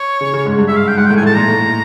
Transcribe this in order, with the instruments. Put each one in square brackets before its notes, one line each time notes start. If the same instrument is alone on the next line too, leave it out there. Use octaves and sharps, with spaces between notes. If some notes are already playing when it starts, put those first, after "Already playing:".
Already playing: [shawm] C#5
[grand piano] C#3
C#3
G#2
G2
[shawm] E5
[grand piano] G#2
[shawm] F5
G5
[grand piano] G#2 [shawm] F#5
[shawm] G5
[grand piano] A2
[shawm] G#5
[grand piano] A2
[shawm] A5
[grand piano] A#2 [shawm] A#5
[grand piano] A2